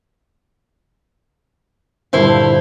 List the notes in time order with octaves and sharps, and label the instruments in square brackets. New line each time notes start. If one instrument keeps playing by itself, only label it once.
[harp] G2 A#2 D3 [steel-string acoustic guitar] E4 C5 F5